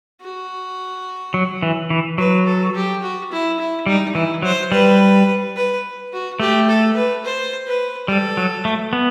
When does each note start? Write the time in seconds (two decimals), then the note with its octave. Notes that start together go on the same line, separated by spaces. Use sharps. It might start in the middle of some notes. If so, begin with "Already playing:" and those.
0.21 F#4
1.34 F#3
1.62 E3
1.90 E3
2.18 F#3 B4
2.47 A4
2.75 G4
3.03 F#4
3.31 E4
3.59 E4
3.86 G3 D#4
4.15 E3 E4
4.42 F#3 C5
4.71 G3 B4
5.56 B4
6.12 F#4
6.40 A3 G4
6.68 A4
6.96 B4
7.25 C5
7.66 B4
8.08 G3 A4
8.37 F#3
8.65 A3
8.93 B3